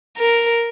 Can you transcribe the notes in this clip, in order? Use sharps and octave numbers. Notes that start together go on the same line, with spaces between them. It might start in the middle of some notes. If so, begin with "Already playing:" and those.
A#4